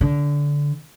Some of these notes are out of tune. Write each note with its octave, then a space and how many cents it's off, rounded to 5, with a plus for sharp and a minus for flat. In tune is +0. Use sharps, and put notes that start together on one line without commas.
D3 -20